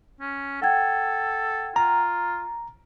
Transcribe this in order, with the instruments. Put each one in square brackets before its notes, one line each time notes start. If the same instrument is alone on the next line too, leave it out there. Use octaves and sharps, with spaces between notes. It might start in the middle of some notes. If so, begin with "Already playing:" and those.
[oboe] C#4
[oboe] A4 [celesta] F#5 G5 G#6
[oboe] F4 [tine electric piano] A#5